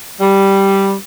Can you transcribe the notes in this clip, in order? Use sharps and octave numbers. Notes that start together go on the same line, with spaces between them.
G3